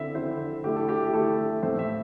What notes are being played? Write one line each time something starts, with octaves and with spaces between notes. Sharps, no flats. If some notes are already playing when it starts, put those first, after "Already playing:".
Already playing: D3 C4 E4 E5
D3 C4 E4 C5
D3 A3 E4 G4
A4
G4
G4
D3 A3 E4 A4
A2 A3 C4 C5
E5